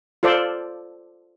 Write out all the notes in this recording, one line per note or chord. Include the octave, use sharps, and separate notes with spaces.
F4 A4 C5 D5